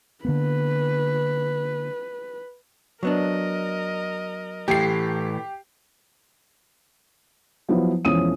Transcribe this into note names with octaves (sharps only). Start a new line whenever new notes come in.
D3 A#3 B3 B4
F#3 B3 D4 A#4 D#5
A2 E3 A3 G4 C7
F3 F#3 B3 E4
E1 E3 F3 C#4 D#6 D#7